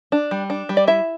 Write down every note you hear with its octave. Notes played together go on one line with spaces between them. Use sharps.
D4
G3
D4
G3
D5
E4 E5